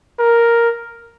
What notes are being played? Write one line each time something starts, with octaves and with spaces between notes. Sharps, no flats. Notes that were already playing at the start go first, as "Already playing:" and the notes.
A#4